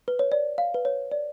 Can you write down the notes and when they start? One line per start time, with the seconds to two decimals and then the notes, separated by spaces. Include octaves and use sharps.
0.08 B4
0.19 C#5
0.32 D5
0.58 F5
0.74 B4
0.85 C#5
1.11 D5